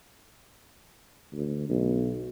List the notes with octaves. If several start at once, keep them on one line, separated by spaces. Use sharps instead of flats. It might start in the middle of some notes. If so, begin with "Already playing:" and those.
D2
B1